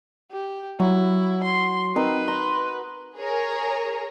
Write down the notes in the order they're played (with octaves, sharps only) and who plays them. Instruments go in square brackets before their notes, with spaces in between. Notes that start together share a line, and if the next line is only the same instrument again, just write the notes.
[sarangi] G4
[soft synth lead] F#3 [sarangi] E4 [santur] F#4
[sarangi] C6
[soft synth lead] C4 [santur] D#4 A#4 [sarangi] B4
[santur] A#5 [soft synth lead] C6
[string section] G#4 A#4 C#5 A#5